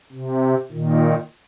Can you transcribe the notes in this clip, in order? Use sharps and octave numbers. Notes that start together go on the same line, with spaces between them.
C3
A#2 D#3